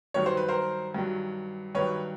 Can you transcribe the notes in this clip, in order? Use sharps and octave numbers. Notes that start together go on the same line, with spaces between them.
G2 D#3 F#3 C#5
C5
B4
A#4 C5
G2 D#3 F#3
G2 D#3 F#3 B4 C#5